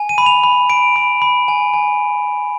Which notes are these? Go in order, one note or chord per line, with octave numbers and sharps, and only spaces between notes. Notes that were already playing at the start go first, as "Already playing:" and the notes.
Already playing: G#5
D#7
B5
F7
B5
B5 D7
B5
B5
G#5
G#5